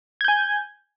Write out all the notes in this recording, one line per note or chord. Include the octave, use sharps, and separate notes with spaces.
G#5 G6 G#6